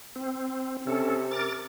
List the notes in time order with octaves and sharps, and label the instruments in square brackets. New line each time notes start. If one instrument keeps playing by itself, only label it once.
[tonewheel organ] C4
[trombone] C3 [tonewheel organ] C#4 A4
[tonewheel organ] A#4 D6 A6